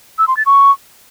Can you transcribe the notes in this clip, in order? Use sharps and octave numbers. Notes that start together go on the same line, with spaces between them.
E6
C6
A6
C#6